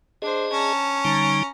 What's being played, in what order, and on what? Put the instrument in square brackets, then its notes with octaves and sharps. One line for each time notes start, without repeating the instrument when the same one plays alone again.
[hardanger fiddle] D4 C5 [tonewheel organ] G#4 D#5
[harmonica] C#4 [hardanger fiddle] A5 A#5
[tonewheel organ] D3 G3 D#4 [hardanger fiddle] A#5